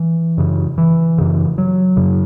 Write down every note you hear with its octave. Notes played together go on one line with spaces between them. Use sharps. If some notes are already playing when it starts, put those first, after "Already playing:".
Already playing: E3
F#2 C#3
E3
F#2 C#3
F#3
F#2 C#3